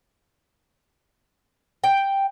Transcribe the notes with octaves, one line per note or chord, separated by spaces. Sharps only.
G5